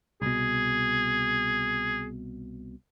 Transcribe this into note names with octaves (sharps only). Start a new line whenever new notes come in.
C2 B2 G#4